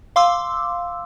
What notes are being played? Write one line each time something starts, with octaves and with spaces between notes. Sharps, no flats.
F5 C6 D6 E6